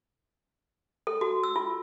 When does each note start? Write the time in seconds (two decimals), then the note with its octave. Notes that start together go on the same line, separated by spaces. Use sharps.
1.07 A4
1.21 F#4
1.44 E6
1.56 F4